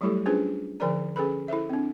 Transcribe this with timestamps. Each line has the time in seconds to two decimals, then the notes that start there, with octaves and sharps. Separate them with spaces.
0.01 F#3 G3 A3 E4 G4 A4
0.26 C#4 D4 F4 G#4 B4 C5
0.80 D3 F3 A#4 C5 D5 A#5
1.16 C#4 G#4 A4 B4 B5
1.48 E4 A4 C5 E5
1.69 C4 D4